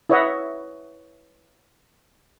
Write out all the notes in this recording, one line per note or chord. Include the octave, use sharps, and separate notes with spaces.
E4 B4 C#5 D#5 E5 F#5